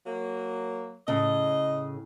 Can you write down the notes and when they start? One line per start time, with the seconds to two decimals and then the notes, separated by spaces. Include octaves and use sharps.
0.06 F#3 A#3
1.08 A2 C#3 D#5